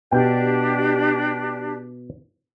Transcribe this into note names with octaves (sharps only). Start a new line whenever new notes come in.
B2 D4 G4 G5